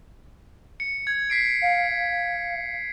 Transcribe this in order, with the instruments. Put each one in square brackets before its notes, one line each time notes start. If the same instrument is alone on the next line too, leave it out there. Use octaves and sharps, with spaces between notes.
[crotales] C#7
G#6
B6 C7 D7
[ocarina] F5
F5